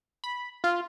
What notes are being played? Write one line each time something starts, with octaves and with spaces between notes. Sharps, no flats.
B5
F4